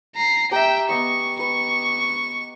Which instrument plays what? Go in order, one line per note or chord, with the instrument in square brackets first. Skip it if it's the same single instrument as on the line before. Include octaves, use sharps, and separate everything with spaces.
[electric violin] A#5 C7
[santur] G4 G#5 A#5 [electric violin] E5 G5
[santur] B3 D#5 E6 [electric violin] C#6
[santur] B4 [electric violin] C#6